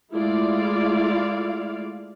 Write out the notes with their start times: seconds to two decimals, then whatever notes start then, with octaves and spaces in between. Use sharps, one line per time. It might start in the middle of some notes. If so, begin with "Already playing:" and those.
0.12 G#3 A3 E4 F4 D5 F5